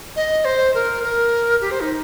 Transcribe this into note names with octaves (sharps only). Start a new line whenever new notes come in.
D#5
C5
A#4
A#4
G4
C5
D#4